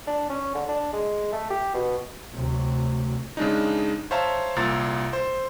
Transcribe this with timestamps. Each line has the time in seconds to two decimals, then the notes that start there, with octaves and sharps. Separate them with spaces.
0.07 D4
0.30 C#4
0.55 D3
0.68 D4
0.93 G#3
1.32 A3
1.50 G4
1.74 B2
2.33 D2 C3 F#3
3.37 C#3 G#3 D4 D#4
4.11 C5 C#5 E5 F5 A5 A#5
4.56 C2 A#2 A#5 E6 A6
5.13 C5